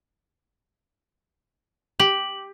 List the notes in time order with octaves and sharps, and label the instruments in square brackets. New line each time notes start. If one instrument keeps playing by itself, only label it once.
[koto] G4 [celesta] F#7